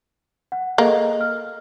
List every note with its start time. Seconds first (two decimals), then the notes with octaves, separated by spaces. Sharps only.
0.52 F#5
0.78 A#3 G#4 A4 D#5
1.21 F6